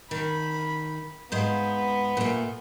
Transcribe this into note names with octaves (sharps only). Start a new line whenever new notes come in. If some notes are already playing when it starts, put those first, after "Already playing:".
D#3 B5
G#2 B3 C5 F5
A#2 A3